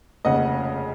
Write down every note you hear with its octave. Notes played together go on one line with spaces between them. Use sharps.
F1 D#2 C#3 D#5 F#5